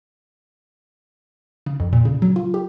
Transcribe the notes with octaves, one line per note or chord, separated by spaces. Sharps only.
C#3
F2
A#2
C#3
F#3
F4
G4